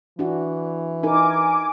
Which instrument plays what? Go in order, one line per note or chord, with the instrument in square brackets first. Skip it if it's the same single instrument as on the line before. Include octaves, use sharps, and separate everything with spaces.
[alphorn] E3 [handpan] D4 F#4
[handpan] D#4 A#4 [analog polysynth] G#5 D6